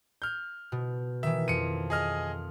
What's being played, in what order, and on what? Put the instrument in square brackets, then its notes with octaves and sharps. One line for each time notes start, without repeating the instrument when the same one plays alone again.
[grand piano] F6 G6
[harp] B2
[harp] D#3 E3 [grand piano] E5
[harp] F2 [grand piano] C#7 D#7
[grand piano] G#4 D#5 F6